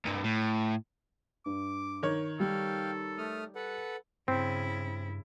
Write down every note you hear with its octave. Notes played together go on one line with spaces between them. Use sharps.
C2 G2
A2
G2 D6
D#3 C#5
G3 A4 F5 G5
A3 D#6 F6
A4 B4 F#5
G2 C#3 C4 E4